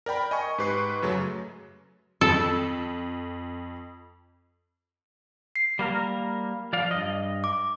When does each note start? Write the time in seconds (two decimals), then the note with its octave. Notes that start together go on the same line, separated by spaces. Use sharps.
0.06 A#4 D5 G5 B5
0.31 D#5 G#5 C#6
0.58 G#2 G4 B4 C#6 C7
1.02 F#2 C#3 F#3 A3
2.21 F2 A4
5.56 C7
5.79 G3 A#3 A#4
6.73 F3 D5 F5
6.91 G2 D#5
7.44 D6